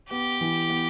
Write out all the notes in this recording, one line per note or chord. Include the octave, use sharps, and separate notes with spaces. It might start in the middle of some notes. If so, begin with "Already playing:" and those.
B3 G4
E3
B3